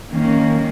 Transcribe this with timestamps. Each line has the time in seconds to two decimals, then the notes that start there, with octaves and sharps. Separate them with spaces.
0.10 D#3 A#3 C#4